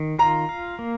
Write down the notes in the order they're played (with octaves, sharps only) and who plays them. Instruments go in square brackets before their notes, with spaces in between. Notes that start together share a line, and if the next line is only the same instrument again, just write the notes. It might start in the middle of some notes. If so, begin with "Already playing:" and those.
Already playing: [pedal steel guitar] D#3
[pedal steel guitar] F4 [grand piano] A#5
[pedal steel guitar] F5
A#3